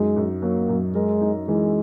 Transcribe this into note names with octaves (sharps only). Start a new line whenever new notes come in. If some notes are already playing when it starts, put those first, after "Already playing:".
Already playing: F#2 G#3 D#4
F#2
F#3 A#3
F#2
G#3 A#4
D#4
E3 G#3